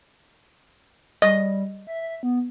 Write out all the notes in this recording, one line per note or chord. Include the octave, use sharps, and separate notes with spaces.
G3 D#5
E5
B3